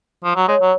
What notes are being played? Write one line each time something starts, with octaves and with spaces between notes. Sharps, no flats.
F3
F#3
G#3 C#5
F#3